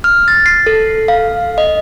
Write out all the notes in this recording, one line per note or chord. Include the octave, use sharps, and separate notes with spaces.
F6
A6
C7
A4
F5
D#5